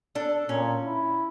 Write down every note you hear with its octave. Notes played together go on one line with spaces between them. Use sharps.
D4 A4
A#2 C#4
E4